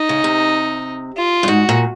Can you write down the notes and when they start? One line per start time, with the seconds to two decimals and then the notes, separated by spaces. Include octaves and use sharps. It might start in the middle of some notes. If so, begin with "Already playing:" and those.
Already playing: D#4
0.09 C#3
0.24 C3
1.17 F4
1.43 G2
1.48 G#2 F#4
1.69 A#2